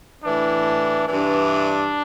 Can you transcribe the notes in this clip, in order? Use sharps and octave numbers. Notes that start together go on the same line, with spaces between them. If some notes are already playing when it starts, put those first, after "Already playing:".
A2 E3 D4
G2 E3 D4